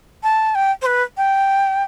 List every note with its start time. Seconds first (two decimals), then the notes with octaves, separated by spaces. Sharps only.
0.23 A5
0.55 G5
0.82 C5
0.86 B4
1.17 G5